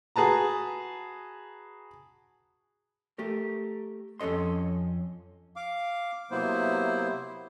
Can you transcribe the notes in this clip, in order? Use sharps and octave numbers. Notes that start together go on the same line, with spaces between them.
F#4 G#4 B4 A5 A#5
A3 G4 A#4
F2 C#4 A4 D#5 C6
F5 D6
C3 F#3 A#3 B3 E4 C5